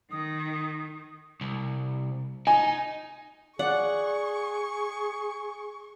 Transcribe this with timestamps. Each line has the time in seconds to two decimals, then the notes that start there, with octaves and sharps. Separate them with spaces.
0.11 D#3 D#6
1.41 C2
2.47 D#4 G#5
3.59 G#4 D5 F#5 C#6